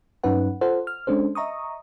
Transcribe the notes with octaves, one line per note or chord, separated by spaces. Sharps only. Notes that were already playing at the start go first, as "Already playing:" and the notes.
G2 F#3 C#4 D#4 B4 F#5
F4 A4 C5 F#5
F6
G#3 C#4 D4 A4 C5
D#5 E5 A#5 C#6 D#6